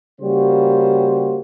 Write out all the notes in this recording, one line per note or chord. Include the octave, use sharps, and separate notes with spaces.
C#3 G3 A#3 F#4 C5